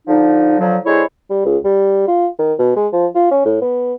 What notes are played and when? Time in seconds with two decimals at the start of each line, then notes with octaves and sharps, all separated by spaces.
0.07 D3 F3 D#4
0.59 D3 F3 F#3
0.85 D3 G#3 E4 C5 C#5
1.30 G3
1.45 C#2
1.64 G3
2.07 F4
2.39 D#3
2.59 B2
2.76 G#3
2.92 F3
3.15 F4
3.31 C#4
3.45 A2
3.61 B3